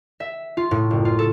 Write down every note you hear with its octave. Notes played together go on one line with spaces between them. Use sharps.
E5
F4
A2
F#1
F4
A4